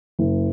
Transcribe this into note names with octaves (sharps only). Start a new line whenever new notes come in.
F#1